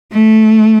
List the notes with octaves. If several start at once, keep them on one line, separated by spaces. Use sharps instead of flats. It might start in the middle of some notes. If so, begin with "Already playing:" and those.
A3